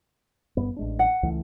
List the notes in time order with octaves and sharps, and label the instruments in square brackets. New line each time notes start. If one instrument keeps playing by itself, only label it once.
[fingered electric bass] G1 G2 B3
A1 G#3 D4
[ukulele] F#5
[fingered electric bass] C#2 E3 A3